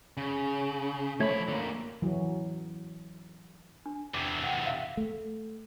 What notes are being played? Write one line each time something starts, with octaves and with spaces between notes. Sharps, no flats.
C#3
F3 A3 C#5 B5
D3 A#3
E3 F#3
D4
E2 C3 D6
F#5 G5
E5 F5
A3